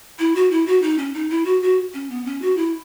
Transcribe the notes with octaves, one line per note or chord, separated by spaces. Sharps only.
E4
F#4
E4
F#4
D#4
C#4
D#4
E4
F#4
F#4
C#4
B3
C#4
F#4
E4